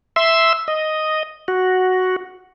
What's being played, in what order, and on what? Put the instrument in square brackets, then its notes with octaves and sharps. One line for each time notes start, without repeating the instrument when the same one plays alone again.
[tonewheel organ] E5 C6 E6
D#5
F#4